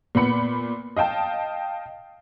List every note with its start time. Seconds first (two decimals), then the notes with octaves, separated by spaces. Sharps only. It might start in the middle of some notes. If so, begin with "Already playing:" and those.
0.15 A#2 B3 B5 C#7
0.96 D#5 F5 G5 A5